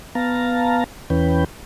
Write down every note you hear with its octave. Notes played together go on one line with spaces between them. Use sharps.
B3 F5 A5 A#5
E2 E3 C#4 B4 G5